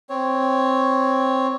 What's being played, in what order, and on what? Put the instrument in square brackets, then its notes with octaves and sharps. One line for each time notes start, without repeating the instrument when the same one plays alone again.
[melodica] C4 C#5